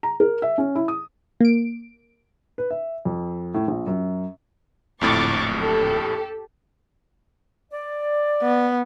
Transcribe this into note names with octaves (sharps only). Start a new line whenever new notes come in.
A#5
A#4
E5
C#4
E4
D#6
A#3 D7
B4
E5
F2
A2
A#1
F#2
D1 A#1 F2 A2 C#6 D6 A6
G4 A4
D5
B3